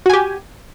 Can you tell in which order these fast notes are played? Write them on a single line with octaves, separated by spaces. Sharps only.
F#4 G#5 G4